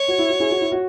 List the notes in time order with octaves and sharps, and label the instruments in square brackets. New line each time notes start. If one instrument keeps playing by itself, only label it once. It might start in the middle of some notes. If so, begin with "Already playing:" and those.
Already playing: [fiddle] C#5
[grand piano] F#4
E4
F#4
E4 G#4
F#4
E4
F#4